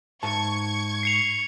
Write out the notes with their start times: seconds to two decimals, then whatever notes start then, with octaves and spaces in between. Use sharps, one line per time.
0.23 G#2 A5 C#6 G#6
1.03 C7 C#7 F7